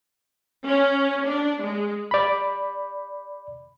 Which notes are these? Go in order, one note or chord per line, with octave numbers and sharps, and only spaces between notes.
C#4
D4
G#3
D5 B5